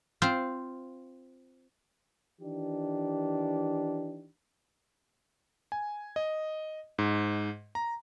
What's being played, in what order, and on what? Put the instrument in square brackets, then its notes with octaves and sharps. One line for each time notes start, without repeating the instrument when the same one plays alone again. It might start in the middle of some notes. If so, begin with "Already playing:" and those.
[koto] C4 F4 C5
[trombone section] D#3 E3 D4 D#4 G4
[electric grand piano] G#5
D#5
G#2
A#5